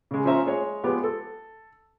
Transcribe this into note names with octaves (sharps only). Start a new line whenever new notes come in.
C#3 G#3
F3 C#4 C5 E5 A#5
G#3 C#5
F3 G#3 B3 G4
A4